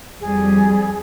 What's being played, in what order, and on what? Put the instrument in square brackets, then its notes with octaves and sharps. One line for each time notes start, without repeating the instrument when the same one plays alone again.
[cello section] F2 G3 [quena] G#4